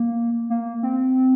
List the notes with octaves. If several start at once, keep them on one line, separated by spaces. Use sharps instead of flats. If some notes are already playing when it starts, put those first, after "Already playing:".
Already playing: A#3
A#3
C4